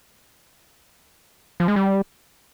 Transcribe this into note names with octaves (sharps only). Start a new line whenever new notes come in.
F3
G#3
G3